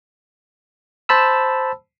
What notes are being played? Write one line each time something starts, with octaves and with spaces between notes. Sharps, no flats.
C5 A5 B5 E6